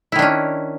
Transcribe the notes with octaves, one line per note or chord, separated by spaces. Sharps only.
D#3 C#4 D4 E4